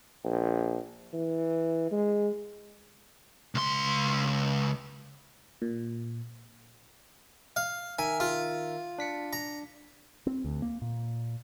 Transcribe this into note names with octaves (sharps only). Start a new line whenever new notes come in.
A#1
E3
G#3
C#2 C6
A#2
F5
D#3 A#4 E5 G#5
F4
D4 B6 C#7
A#5
C4
D2
A#3
A#2